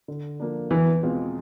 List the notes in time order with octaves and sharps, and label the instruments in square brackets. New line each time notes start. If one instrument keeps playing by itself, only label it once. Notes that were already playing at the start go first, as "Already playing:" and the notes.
[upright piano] D3
F3 A#3 D4
[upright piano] E2 [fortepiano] E3
[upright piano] B2 G#3 C4 F4